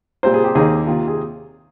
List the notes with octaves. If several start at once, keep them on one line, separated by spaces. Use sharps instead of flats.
A#2 G3 C4 F4 C5
G#4
G4
D#2 D#3 A#3 D#4 G#4
C3 D#3 A#3 F4
G#4